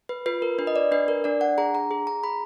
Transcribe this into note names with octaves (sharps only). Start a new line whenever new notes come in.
B4
F4 B4
A#4
D4 B4
D#5
D5
D4 B4
A#4
D4 D5
F#5
G#4 A#5
A#5
G#4
A#5
G#4 B5